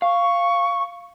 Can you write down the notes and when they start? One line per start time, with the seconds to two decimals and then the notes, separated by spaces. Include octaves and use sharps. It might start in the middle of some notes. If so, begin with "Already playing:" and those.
0.02 F5 C#6